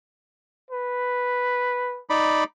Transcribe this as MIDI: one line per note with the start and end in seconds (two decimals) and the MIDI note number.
0.71 2.01 71
2.10 2.44 63
2.10 2.44 74
2.10 2.44 83